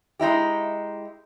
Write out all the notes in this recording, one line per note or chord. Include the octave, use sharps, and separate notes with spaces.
G#3 D#4 E4 G4